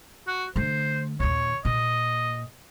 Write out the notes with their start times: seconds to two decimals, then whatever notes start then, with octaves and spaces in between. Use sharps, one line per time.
0.27 F#4
0.56 D3 A3 C5
1.20 D#2 A#2 C#5
1.65 A#2 D#5